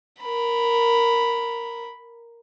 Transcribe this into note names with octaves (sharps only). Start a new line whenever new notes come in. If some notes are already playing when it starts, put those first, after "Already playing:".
A#4 B5